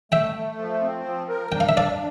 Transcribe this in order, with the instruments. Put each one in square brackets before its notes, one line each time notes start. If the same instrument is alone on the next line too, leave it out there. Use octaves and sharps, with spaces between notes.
[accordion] A3 [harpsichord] E5 G5
[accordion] A3
F3
C4
F3
A#4
[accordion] D4 [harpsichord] G5
[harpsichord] F5
E5
[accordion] D4 [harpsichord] D5 F5